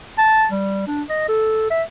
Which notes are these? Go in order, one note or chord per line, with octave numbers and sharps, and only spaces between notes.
A5
G3
D4
D#5
A4
E5